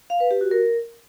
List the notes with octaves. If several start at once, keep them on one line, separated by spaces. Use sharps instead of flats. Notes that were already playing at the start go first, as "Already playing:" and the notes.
F5
B4
G4
F#4
A#4